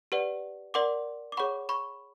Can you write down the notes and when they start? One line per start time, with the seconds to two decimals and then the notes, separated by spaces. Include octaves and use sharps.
0.12 G4 B4 D5 F#5
0.74 A#4 D5 F#5 C6 D6
1.32 D6
1.37 G#4 C#5 F#5 B5 C#6
1.69 B5 C#6